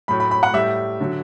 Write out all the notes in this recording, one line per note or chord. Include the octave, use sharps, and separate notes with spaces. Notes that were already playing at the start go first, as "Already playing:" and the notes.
A2 F#3 B5
B5
B5
F#5
A2 G3 E5
D3 F#3